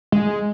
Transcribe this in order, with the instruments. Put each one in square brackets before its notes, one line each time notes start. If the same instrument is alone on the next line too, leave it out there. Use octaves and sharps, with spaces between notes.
[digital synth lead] G#3